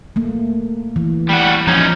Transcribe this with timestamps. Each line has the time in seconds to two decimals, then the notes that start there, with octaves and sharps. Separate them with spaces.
0.16 A3 A#3
0.96 E3
1.29 G3 F#4
1.67 F3 C#4 D#4